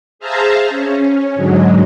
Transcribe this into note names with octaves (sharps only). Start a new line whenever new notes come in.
G#4 C5 E5 F5 A5 A#5
C#4
G#2 D3 F#3 G#3